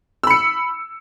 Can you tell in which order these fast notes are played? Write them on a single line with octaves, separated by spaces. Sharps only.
E6 B5 C#7